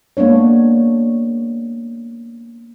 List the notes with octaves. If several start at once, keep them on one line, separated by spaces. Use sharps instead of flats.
G#3 A#3 B3 D4 C#5